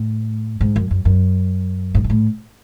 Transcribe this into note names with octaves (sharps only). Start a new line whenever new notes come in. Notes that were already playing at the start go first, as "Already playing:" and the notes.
Already playing: A2
G#2
F#2
F#2
F#2
G#2
B2
A2